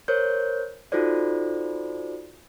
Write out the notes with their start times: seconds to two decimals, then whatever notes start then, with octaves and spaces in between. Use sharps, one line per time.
0.08 A#4 C5 C#5 G6
0.92 D#4 F4 F#4 A4 C5 D5